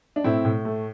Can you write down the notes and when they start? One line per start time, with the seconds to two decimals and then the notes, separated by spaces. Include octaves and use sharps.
0.16 D4
0.24 A2 C4 E4
0.45 A2
0.65 A3